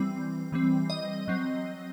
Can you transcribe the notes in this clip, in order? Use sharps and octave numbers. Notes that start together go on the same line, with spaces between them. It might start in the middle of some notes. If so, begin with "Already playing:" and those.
Already playing: E3 G3 C4
E3 G3 C4
D#5
F#3 C4